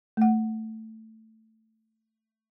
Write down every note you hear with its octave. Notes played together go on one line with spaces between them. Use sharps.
A3 F#5